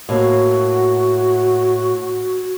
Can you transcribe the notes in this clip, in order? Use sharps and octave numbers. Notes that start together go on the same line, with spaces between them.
A2 A#3 F#4